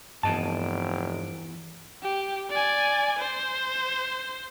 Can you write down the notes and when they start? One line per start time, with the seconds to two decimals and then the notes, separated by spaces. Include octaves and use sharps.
0.23 F1 E2 G2 D#5 A5 D7
2.03 G4
2.50 D5 G#5
3.19 C5